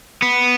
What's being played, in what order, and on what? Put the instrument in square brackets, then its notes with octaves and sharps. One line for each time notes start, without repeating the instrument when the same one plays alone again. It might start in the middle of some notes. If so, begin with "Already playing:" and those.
[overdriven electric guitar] B3